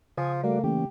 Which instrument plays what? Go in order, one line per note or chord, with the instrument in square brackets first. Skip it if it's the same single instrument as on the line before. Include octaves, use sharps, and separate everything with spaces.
[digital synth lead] C#3 [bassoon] F3 [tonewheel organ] G#5 D#6
[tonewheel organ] G3 F#4 D5 [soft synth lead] A3 [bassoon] A#3
[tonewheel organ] E3 A#3 C#4 [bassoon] G4